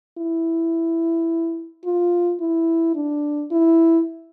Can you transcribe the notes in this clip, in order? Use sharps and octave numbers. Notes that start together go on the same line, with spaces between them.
E4
F4
E4
D4
E4